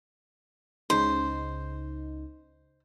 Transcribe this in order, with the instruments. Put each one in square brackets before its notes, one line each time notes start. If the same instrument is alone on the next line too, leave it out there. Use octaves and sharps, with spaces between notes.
[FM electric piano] C#2 C#3 D#4 [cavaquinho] C5